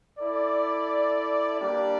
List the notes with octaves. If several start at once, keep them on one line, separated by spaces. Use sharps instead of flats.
E4 A4 D5
G3 A#3 D4 G4 D5